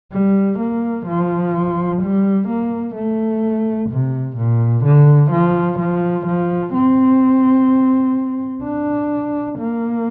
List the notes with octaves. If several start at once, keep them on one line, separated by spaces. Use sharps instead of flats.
G3
A#3
F3
G3
A#3
A3
C3
A#2
D3
F3
F3
F3
C4
D4
A#3